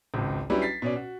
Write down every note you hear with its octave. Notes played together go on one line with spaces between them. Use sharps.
G#1 C#2
F#3 G3 C#4 D4 E4 B4
A6 B6 C7
B2 C#4 D5
F#4